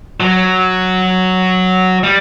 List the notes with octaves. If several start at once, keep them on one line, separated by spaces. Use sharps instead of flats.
F#3
G3